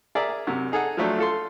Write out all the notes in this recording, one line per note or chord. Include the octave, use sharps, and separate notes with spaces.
G#4 A#4 D5 E5
F#2 C3
D#4 G#4 A4 F#5
F3 F#3 A3 D4 C5
F4 A4 C6